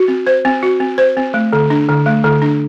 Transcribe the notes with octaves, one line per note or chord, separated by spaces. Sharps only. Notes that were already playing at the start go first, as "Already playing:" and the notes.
Already playing: F#4
C4
C5
C4
F#4
C4
C5
C4
A3
D3
D4
D3
A3
D3
D4